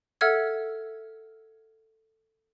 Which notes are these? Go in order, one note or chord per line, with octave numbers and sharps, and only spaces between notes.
A4 E5 F#5 E6 F6 G#6